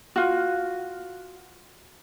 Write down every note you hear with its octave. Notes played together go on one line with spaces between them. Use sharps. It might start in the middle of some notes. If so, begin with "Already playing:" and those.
F4 F#4